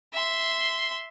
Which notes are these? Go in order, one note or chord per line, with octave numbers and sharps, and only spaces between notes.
E5 C6